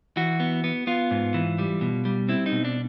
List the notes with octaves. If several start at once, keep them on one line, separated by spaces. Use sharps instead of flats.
E3 F#4
B3
B3
B3 F4
G#2
E3
G3
B2
G3
C4 E4
D#4
B2
D4